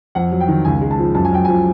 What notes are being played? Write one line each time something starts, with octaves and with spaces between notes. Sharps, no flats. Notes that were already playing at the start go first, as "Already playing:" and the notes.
F2 F#5
F#3
G5
D#3
C#2 G#5
G#3
A5
F3
F#2 A5
G#5
F#2 G5
G#5
F3